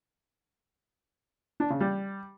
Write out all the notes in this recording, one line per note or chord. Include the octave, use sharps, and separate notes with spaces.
D4
C#3
G3